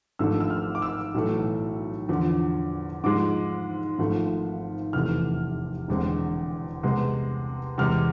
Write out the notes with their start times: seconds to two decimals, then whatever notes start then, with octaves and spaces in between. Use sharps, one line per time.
0.19 G#1 G#2 F3 A3 D4 E6
0.40 E6
0.50 F6
0.75 D6
0.82 E6
1.14 B1 A2 E3 A3
2.09 E2 D3 F3
3.04 G#2 F3 G#3 D6
3.98 G#1 G#2 F3 A3
4.93 F1 E2 C3 E3 A3 F6
5.88 E1 E2 D3 G#3 C4
6.83 C2 C3 G#3 B3
7.78 E2 C3 G#3 F6